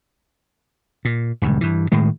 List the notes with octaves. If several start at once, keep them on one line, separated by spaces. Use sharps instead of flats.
A#2
D#1 C#2 G2
G2 E3
A2 D#3 G#3